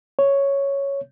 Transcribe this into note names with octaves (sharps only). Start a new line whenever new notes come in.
C#5